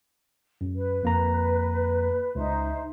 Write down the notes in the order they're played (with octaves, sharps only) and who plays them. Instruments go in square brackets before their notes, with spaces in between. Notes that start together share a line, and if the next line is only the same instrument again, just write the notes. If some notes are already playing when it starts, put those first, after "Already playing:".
[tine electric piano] F#2
[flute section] B4
[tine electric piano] F2 A#3 A#5
[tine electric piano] C#2 [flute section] D#4 C5 E5